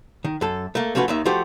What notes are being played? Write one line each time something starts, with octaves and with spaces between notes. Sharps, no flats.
D#3
F#2 A4
A3 A#3
F3 A3 C#4 F#4 B4
D#2 D#3 E5
F3 A3 F#4 G4 C5